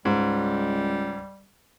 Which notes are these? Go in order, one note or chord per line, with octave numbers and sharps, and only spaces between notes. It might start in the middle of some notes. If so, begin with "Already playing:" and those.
C#2 G#2 G3